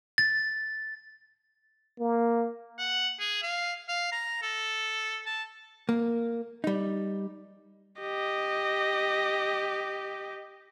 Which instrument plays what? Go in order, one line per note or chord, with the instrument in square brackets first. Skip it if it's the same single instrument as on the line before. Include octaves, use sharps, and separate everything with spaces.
[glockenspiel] A6
[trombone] A#3
[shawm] F#5
G#4
F5
F5
A#5
A4
A5
[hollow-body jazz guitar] A#3
G3 D#4
[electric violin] G4 D#5